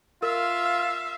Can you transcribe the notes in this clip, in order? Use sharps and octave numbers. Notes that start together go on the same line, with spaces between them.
F4 A#4 E5 F5